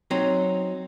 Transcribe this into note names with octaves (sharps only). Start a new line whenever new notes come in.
F#3 C4 D#4